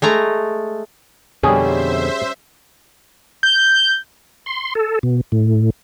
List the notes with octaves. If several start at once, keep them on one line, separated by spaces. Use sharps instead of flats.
G#3 A3 A#5
F2 B2 D3 G3 C#4 G#4 C5 E5
G6
C6
A4
B2
A2